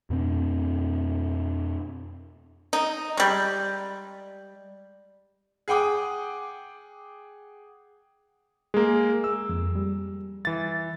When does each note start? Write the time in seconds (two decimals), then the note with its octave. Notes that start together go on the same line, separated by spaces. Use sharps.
0.10 F2 B2 C4
2.73 D#4
3.17 G3 G#3
5.68 G#4 F#5 G5 D6 D#6
8.74 G#3 A#3 G#4
9.24 E6
9.49 F2
9.75 G3
10.45 E3 A6